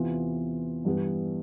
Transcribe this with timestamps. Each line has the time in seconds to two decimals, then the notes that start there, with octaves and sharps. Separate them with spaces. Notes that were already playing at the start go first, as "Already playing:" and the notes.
Already playing: E2 C3 E3 B3 F4
0.85 G2 E3 G3 B3